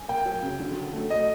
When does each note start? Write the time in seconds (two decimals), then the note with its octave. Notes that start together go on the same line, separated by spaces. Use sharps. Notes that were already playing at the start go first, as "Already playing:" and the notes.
Already playing: G#5
0.08 A#3 G5
0.26 F#3
0.42 C#3
0.59 D3
0.77 F#3
0.93 A3
1.10 A3 D#5